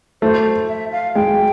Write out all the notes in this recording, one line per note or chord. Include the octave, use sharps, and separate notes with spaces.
A3 C5
E5
F5
G#3 G5